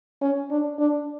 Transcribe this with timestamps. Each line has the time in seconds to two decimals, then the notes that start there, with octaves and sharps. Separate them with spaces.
0.22 C#4
0.51 D4
0.79 D4